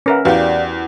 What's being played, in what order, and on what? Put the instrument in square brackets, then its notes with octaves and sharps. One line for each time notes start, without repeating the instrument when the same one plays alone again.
[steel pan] C#4 A#4 E5 [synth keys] B4 F#5
[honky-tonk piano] E2 [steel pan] F#4 G4 G5 [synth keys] B4 D5 F5